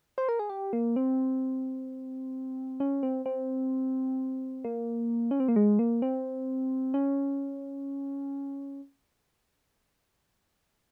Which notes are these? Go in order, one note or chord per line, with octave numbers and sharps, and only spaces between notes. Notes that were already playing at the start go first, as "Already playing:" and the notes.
C5
A#4
G#4
G4
A#3
C4
C#4
C4
C4
A#3
C#4
C4
A#3
G#3
A#3
C4
C#4